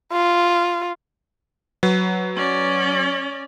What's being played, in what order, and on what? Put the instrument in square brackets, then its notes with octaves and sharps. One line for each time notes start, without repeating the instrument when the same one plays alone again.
[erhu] F4
[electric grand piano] F#3 B4
[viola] C#4 D5